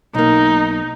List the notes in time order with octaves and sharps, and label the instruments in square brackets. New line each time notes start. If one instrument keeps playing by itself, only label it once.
[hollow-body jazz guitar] B1 A#3 [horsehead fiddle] D#4